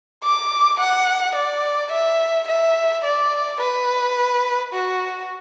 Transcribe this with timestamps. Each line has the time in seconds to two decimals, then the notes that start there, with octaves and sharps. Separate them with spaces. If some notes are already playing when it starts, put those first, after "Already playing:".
0.23 D6
0.80 F#5
1.35 D5
1.92 E5
2.48 E5
3.05 D5
3.61 B4
4.73 F#4